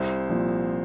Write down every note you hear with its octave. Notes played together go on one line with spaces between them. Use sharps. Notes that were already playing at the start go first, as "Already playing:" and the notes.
Already playing: C2 C4
A#2 F3